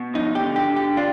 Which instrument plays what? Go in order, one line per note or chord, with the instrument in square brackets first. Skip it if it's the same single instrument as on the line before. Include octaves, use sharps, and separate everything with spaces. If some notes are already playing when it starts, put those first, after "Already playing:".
Already playing: [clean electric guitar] B2
[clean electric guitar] F3 [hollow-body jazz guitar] D#4
[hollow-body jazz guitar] G4
[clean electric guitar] D3
[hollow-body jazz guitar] G4
[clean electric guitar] D3
[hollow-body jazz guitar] G4
[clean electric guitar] D4 [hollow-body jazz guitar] F4